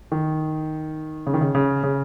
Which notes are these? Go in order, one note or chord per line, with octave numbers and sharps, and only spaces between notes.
D#3
C#3
D#3
C#3
C#3
C#3